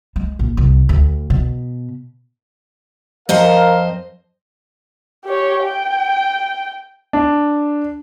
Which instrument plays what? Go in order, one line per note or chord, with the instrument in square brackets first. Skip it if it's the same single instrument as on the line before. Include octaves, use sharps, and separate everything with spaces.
[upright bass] G#3
A#1
C2
D2
B2
[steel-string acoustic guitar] F2 C5 D#5 [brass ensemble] A#4 F5
[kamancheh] G4 C#5
G5
[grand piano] D4